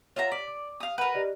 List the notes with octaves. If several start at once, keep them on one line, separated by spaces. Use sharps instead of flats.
F4 C#5 E5 F#5 A#5
D5 B6
D6
F5 D#6
A#4 B4 F#5 B5 D#7
G4 D5 D#5